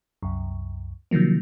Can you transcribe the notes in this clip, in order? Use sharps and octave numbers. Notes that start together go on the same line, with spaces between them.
C2 F#2
C3 D#3 F3 F#3 A#3